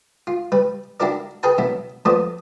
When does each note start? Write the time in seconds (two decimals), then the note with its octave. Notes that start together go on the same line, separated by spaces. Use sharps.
0.27 F4
0.52 G3 B4
1.00 D4 E4 F#4 G4 A#4 D5
1.43 G#4 A#4 B4 G5 A5
1.58 B2 F#3 B3 E4
2.05 F3 A3 B3 C5 D5 D#6